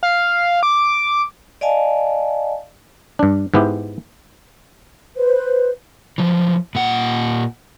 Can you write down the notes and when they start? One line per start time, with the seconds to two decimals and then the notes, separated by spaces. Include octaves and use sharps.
0.03 F5
0.63 D6
1.61 D5 D#5 F5 G#5 A5
3.19 G2 D4
3.54 G#2 G#3 B3 E4 G4
5.16 B4 C5
6.18 E3 F3
6.75 A#2 F#5